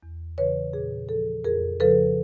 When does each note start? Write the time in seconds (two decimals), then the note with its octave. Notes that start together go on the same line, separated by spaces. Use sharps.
0.03 E2
0.38 C#3 E3 B4 C#5
0.73 A#2 G#4
1.09 F3 A4
1.44 F2 G#4 A#4
1.80 C#3 F3 A4 B4